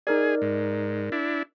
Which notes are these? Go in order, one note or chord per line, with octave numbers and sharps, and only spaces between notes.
D#4 G#4 A#4 D5
G#2
D4 E4